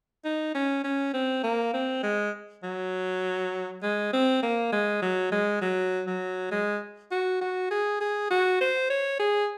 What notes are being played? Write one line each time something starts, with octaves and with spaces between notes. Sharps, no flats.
D#4
C#4
C#4
C4
A#3
C4
G#3
F#3
G#3
C4
A#3
G#3
F#3
G#3
F#3
F#3
G#3
F#4
F#4
G#4
G#4
F#4
C5
C#5
G#4